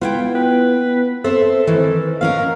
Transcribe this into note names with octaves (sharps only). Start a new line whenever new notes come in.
B3 E4 F4 G5
B4
C4 A4 C5 E5
D#3 E3
B3 C#4 A#4 F5